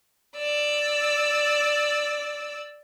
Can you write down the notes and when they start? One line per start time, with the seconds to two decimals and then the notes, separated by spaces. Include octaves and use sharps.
0.36 D5 E6